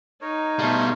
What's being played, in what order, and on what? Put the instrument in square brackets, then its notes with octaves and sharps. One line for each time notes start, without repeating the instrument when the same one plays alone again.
[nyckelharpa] D#4 [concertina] A#4 C#5
[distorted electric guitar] B2 G3 [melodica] A3 F5 C6